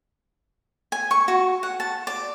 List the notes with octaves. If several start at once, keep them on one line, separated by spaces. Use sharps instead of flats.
G#5
C#6
F#4
F#5
A5
D5